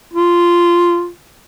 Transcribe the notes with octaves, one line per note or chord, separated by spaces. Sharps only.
F4